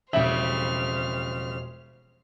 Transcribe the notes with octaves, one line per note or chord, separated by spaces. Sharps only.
E1 F2 C#3 G3 C5 E5 F6 F#7